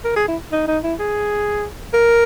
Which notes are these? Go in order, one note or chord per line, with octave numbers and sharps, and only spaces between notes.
A#4
G#4
E4
D#4
D#4
E4
G#4
A#4